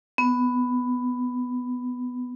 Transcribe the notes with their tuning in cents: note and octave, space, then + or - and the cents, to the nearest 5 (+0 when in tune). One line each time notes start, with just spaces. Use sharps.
B3 +10